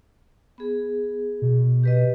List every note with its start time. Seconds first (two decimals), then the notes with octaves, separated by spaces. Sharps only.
0.58 B3 G#4
1.42 B2
1.83 G4 B4 D#5